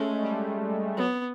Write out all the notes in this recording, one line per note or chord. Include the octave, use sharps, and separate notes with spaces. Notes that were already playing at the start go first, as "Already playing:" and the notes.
Already playing: G#3 A3 C#4
G3
F#3 B3